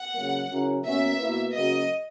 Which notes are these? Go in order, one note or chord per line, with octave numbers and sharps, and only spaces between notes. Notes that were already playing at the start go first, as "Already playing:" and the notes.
Already playing: F#5
C#3 F#3 A#3
C#3 F#3 C#4 E4 A#4
B2 A#3 C#4 F#4 A#4 E5
B2 A#3 E4 B4
C#3 F#3 A#3 C#4 F#4 D#5